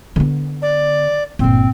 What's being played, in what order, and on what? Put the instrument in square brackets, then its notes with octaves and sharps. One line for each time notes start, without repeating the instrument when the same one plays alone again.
[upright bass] D3 B3
[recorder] D5
[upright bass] G1 A#2 [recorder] C4